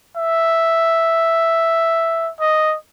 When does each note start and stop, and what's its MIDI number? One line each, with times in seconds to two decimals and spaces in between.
0.16 2.31 76
2.40 2.76 75